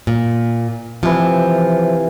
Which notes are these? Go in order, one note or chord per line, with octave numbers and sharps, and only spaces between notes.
A#2
C3 E3 F3